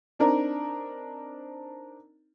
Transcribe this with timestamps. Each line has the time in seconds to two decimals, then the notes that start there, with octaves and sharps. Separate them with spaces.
0.19 C4 D4 D#4 A#4 D5